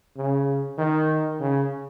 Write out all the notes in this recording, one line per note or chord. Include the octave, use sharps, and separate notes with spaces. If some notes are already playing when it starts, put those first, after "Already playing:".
C#3
D#3
C#3